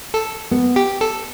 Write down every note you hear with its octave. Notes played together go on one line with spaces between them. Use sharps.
A4
B3
G4
A4